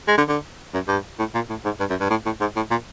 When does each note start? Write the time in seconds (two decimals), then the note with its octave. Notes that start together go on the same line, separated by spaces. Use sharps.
0.08 G#3
0.18 D3
0.28 D3
0.74 F#2
0.88 G2
1.19 A2
1.35 A#2
1.50 A2
1.65 G#2
1.80 G2
1.90 F#2
2.01 G2
2.10 A2
2.26 A2
2.41 G#2
2.56 A2
2.71 A#2